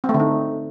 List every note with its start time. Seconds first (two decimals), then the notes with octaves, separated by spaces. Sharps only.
0.04 C4
0.09 A3
0.14 D3
0.19 D#4